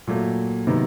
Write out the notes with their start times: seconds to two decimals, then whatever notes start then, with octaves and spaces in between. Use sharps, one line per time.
0.07 A#2 F#3 A3
0.67 C3 D#3 F#3 B3